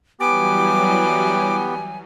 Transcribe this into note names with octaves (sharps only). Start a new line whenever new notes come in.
E3 F#3 G3 B3 G4 G#5 D6